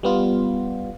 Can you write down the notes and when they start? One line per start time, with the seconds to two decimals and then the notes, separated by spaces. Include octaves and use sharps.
0.03 G3 B3 F4